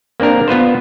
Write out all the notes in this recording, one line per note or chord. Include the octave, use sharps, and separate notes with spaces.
A#3 C4 D4 A#4
B3 F4 B4 C5